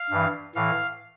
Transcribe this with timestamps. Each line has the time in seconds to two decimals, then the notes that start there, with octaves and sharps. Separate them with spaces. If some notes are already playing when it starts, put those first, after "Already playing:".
Already playing: F5
0.10 G2 E3
0.55 A2 E3 F5